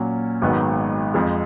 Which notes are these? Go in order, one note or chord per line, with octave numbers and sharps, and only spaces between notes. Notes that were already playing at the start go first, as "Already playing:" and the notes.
Already playing: A#2 F#3 C#4
G#1 G#2 D#3 F#3 B3
F2 F3 G#3